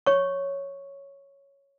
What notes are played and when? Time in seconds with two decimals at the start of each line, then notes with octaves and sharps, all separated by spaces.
0.06 C#5 C#6